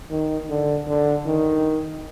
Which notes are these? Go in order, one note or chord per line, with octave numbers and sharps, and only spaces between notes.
D#3
D3
D3
D#3